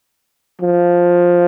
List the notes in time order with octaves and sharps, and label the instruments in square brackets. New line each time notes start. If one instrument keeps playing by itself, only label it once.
[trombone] F3